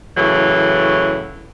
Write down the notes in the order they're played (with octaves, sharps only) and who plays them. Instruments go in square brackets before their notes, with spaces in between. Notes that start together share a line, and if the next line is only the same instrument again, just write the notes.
[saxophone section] A2 C#3 E3 F#3